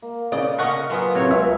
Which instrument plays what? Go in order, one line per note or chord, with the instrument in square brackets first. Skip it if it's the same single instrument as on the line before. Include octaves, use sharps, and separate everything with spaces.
[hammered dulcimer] A#3
[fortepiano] C#3 [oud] D5 D#5
[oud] C#3 C#4 [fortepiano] D#5 F#5 C#6
[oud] F#3 B3 C4 [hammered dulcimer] F4 G#4
[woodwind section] A2 C#4 C#5 [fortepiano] C3
[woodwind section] C#2 [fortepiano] E5